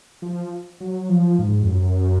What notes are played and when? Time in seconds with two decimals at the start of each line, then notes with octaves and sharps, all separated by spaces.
0.22 F3
0.80 F#3
1.09 F3
1.39 G#2
1.63 F2
1.68 F#2